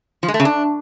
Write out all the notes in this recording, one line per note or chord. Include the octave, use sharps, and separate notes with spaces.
F3
G#3
A3
C#3
D4